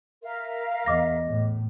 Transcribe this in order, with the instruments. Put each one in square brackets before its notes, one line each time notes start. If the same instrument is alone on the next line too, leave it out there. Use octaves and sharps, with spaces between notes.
[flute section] A#4 E5 F5
[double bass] E2 [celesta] D#5 D6 A#6
[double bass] A2